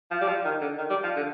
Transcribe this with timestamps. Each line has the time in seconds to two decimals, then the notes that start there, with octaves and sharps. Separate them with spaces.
0.11 F3
0.21 G3
0.28 F3
0.45 D#3
0.61 D3
0.78 D#3
0.90 G3
1.03 F3
1.16 D3